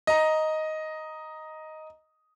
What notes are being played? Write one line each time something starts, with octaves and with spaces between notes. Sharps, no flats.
D#5 A#5